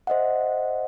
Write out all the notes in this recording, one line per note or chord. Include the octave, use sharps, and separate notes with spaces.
C5 D#5 E5 F#5